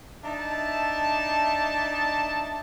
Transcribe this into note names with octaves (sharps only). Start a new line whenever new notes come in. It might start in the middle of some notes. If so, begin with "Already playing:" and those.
D4 D#4 E5 A5